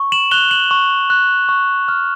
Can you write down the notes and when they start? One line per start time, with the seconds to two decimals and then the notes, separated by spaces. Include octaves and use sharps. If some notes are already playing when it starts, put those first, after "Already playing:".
Already playing: C#6
0.12 E7 F#7
0.31 F#6 F7 G7
0.51 E7 F#7
0.71 C#6
1.10 F#6
1.49 C#6
1.88 F6